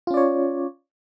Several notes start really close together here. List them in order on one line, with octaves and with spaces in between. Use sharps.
F4 C#4 D5 C#5